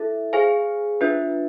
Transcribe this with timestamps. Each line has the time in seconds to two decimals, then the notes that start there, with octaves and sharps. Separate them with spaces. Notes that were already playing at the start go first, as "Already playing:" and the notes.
Already playing: E4 A4 E5
0.33 G#4 C5 F5 G#5
1.01 D4 F4 B4 E5